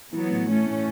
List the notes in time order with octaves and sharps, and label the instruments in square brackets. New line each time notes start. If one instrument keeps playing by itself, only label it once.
[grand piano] E3 [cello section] F#3 B3
[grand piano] A2
[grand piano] E3 [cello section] A3 C#4
[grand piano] A2